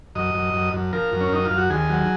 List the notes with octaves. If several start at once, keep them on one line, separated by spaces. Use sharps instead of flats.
F#2 D#5
F#2
F#2
F#2
F3 A#4
F#2
C#4
F#2 D#4
F4
F#2
F#4
D#2 G#4
F#3